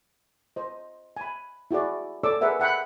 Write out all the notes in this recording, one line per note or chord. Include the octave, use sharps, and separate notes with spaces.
C5 D#5
G#5 B5
E4 F#4 G#4 D5
A4 C#5 D5 G#5 D6 E6
G#4 A#4 B4 E5 F#5
E5 F#5 G5 B5